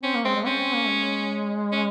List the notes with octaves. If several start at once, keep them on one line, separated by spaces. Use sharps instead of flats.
C4 C#4
A#3
G#3 C4
G#3
C4 C#4
C4
A#3
G#3
C#4